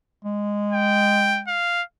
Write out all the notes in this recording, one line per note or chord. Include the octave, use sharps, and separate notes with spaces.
G#3
G5
F5